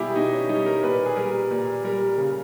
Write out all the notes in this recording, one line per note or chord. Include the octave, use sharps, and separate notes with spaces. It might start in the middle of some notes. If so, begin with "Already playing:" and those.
Already playing: B2 G3 E4 G4 G#4
B2 D#4
C#4
G3 D#4
A#4
A#2 B4
G#4
G3 A#4
A#2
G3 A#4
C#3